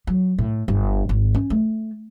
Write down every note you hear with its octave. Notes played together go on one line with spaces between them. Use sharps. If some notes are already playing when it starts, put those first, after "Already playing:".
F#3
A2
G1
G#1
C#4
A3